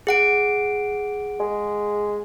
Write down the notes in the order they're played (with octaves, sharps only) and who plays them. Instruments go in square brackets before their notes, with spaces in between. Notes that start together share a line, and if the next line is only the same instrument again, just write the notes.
[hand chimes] G#4 F#5 D7
[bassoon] G#3